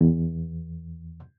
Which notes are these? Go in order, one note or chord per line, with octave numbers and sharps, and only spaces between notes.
E2